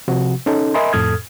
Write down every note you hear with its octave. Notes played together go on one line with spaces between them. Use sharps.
C3 F3 F#4
C#4 D#4 A4
A#4 D#5 E5 G#5 B5 C6
F2 A2 A4 D#6 F6 G#6